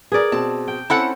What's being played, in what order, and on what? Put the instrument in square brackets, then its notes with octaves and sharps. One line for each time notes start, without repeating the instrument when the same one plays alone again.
[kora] G#4 D5 [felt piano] A#4 B4
[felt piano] B2 C4 [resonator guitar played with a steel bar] A5
[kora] G5
[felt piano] C4 C#4 [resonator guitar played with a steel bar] E4 A4 F#5